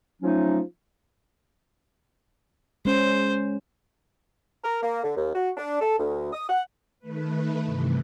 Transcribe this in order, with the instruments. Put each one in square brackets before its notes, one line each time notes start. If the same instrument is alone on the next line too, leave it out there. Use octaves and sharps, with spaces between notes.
[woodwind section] F3 F#3 A3 C#4 D#4
[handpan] G#3 C#4 [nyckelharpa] C5
[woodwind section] A#4
A#3
D3
D#2
F#4
D4
A4
D2
D#6
F#5
[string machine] D#3 A3 B4
G2 C3 E3